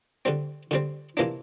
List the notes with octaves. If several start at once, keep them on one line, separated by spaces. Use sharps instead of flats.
D3 G3 C4
D3 G3 C4
C3 E3 A#3 D4